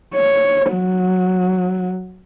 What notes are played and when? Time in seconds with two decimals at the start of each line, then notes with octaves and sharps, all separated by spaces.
0.15 C#5
0.73 F#3